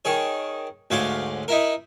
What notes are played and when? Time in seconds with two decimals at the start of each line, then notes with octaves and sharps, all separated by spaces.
0.05 D#3 G#4 C#5
0.91 D2 G#2 C#5 F5 C6 D6
1.48 D#4 E4 A#4